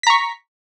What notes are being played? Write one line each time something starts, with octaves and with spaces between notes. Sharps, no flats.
A#5 C#6 B6